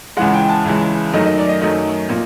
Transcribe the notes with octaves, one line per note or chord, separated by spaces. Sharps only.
C#2 C#3 E3 G#3 F#5
G5
A5
C#2 C#3 E3 G#3
F#2 D#3 F#3 A3 D#5
D#5
D5
D#5
F#2 D#3 F#3 A3 D#5
A#2